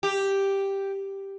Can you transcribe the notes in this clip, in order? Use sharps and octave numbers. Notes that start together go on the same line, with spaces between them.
G4